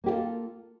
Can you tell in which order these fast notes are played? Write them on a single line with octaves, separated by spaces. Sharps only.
A#3 G4 F4 A4